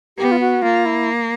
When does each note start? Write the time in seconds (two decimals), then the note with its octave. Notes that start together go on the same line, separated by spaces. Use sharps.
0.18 B3 G4
0.31 F4
0.40 F#4
0.62 A#3 F4
0.85 E4